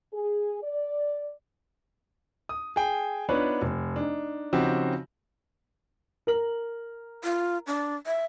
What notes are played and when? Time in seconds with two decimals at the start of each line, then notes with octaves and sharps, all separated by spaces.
0.13 G#4
0.62 D5
2.49 D#6
2.76 G#4 G5
3.29 B3 D4 D#4 F4 B4 C#5
3.62 F1
3.96 D4 D#4
4.53 C#3 F3 C4 D#4 F#4 G4
6.27 A#4 F#7
7.24 F4
7.67 D4
8.07 E5